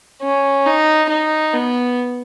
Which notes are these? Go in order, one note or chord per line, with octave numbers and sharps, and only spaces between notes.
C#4
D#4
D#4
B3